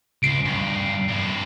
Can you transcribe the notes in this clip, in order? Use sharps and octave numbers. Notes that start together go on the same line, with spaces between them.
C#2 C7 D7
G2 B2
G2 E4